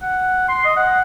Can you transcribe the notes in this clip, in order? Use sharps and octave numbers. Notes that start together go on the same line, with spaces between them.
F#5
C6
D#5
F#5